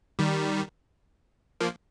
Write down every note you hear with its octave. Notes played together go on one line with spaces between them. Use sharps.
D#3 G3
F3 A#3